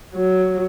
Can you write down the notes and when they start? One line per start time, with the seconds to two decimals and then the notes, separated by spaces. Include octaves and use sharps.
0.14 F#3